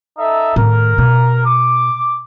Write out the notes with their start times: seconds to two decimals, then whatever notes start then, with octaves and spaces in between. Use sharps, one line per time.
0.17 D#4 A4 E5
0.56 A2 D#3 A#4
0.98 B2
1.45 D6